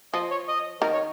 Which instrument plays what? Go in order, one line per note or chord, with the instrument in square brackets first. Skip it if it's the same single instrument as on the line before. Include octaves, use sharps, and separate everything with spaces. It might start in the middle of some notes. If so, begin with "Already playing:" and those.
[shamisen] F3 [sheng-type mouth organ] D#5
[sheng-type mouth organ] C#5
D#5
[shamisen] D#3 [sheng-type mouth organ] A#4
[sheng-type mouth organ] C#5